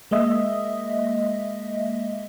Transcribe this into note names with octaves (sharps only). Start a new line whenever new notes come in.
G#3 A#3 D#5 E5